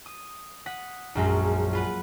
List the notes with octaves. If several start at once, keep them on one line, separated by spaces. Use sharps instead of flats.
D#6
F#5 D#6 B6
A#1 F#2 G#3
F4 B4 F#5